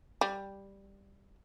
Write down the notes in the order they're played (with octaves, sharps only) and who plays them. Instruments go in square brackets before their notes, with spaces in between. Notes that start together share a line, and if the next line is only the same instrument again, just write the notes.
[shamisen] G3